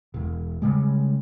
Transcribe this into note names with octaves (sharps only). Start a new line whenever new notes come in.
E1
C#3 G3 G#3